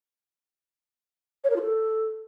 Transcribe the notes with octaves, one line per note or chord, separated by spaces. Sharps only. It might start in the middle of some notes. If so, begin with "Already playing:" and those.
C#5
A#4
F4
A4